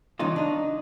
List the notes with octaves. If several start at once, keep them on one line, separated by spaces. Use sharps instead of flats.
G2 C#3 E3 D#4 F4
D4 D#4